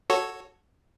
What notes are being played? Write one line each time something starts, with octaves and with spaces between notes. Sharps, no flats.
F#4 A4 C#5